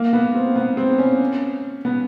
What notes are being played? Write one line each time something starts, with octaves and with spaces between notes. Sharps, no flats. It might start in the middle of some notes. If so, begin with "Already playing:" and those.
Already playing: A#3
B3
C4
B3
C4
C#4
B3